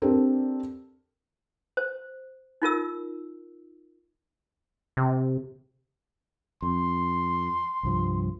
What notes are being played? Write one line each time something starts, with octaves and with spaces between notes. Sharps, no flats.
C4 D4 G4 A4 A#4
C5
D#4 F4 A#4 E6
C3
F2 C6
C2 G2 F3